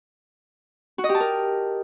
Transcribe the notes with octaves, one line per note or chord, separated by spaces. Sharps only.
F#4
D#5
G4
A5
A#4